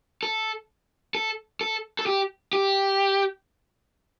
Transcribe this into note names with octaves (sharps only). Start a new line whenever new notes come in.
A4
A4
A4
A4
G4
G4